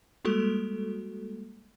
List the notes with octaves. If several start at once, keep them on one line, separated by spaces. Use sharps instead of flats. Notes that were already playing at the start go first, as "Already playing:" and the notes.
G3 G#3 A#3 F#4 A4